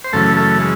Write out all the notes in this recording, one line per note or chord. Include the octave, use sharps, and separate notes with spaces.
C5
F#2 C#3 E3 A3 A4
A3 A4
G#3